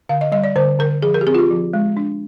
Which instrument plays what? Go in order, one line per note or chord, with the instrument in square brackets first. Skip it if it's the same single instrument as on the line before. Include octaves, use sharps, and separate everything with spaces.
[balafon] D3 F5
D#5
G3 D#5
D5
D3 C5
D3 A#4
F3 G#4
A#4
G4
C4 G#4
F4
G4
F3
G#3
D4